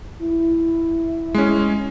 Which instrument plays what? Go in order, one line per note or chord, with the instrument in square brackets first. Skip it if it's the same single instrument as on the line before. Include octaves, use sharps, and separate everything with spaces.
[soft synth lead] E4
[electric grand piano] G#3 C#4